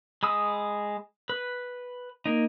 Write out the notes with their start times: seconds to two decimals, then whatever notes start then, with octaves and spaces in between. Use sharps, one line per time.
0.23 G#3 B5 D#6 E6
1.29 B4
2.26 A#3 D#4